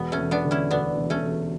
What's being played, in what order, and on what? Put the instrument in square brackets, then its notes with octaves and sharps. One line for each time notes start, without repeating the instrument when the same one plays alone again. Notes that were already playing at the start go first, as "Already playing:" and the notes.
Already playing: [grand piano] E1 [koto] B3
[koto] A3 C#4
[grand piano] E1
[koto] B3 D4
[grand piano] D3
[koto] C#4 E4
[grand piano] D2 [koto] B3 D4
[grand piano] E1
[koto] A3 C#4
[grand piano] E1